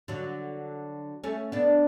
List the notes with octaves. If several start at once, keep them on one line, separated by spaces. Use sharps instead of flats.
D3 F#3
A3 C#4
B3 D4